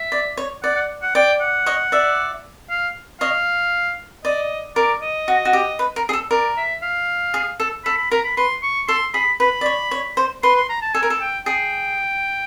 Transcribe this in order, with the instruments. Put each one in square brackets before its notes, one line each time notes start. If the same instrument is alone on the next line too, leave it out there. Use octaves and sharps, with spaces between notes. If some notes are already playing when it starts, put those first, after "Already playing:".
Already playing: [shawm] E5
[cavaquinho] D5
C#5
[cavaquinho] D5 [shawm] F#5
[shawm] F#5
F#5
[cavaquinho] D5 [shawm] G5
[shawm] F#5
[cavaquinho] C#5 D#5
D5 E5
[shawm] F5
[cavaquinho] C#5 D#5 [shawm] F5
[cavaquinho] D5 [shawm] D#5
[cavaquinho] A#4 [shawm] D5
[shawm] D#5
[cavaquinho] F#4
F#4
G4
B4
A#4
G#4
A4
[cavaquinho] A#4 [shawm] D5
[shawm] E5
F5
[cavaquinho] G#4
A4
[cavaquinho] A4 [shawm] B5
[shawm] B5
[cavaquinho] A#4 [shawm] A#5
[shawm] B5
[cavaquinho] B4 [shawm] C6
[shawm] C#6
[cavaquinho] A4 [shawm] C6
[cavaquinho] G#4 [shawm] B5
[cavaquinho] B4 [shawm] B5
[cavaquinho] D5
C#5
C#5
C5
[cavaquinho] B4 [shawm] C6
[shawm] C6
A#5
A5
[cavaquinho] A4 [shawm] G#5
[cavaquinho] A#4
A4
[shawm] G5
[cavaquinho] G#4 [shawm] G5